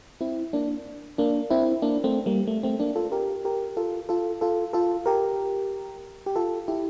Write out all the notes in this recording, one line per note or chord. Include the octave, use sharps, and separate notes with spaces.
C4 E4
A#3 D4
A#3 D4
C4 E4
A#3 D4
A3 C4
G3 A#3
A3
A3 C4
A#3 D4
F4 A4
G4 A#4
G4 A#4
F4 A4
F4 A4
F4 A4
F4 A4
G4 A#4
G4
F4 A4
E4 G4